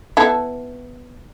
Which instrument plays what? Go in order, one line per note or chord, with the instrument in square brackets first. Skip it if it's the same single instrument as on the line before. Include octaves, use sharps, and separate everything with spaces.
[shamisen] B3 E4 A4